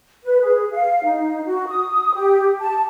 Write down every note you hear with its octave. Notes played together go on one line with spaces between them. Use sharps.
B4
G#4
F5
D#4
F#4
D#6
G4
A5